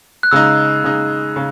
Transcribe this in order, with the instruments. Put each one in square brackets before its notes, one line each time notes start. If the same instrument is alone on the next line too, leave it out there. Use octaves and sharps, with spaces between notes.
[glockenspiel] F#6
[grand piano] C#3 G#3 D#4 [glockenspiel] E6
[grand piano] C#3 G#3 D#4
C#3